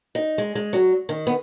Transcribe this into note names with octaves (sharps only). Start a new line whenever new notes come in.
D#4
G#3
G#3
F#3
D#3
B3